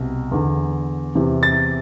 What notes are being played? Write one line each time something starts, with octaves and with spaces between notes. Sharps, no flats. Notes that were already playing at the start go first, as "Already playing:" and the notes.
Already playing: C2 B2
E2 D3
E2 C3 E3
A6